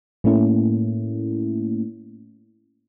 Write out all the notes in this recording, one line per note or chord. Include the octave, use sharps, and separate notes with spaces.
A2 A3 A#3 C#4 E4